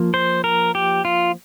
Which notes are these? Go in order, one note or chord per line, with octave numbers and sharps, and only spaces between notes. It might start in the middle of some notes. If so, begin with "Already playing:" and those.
Already playing: F3 A#3
C5
A#4
G4
F4